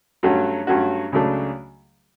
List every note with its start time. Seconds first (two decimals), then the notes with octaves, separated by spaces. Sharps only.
0.23 G2 F#3 A3 C#4 F#4
0.67 G2 F#3 A3 C#4 F#4
1.12 C#2 C#3 F#3 A3 D4